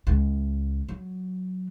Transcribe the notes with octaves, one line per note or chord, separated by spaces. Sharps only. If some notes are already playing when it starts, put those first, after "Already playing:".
C#2
F#3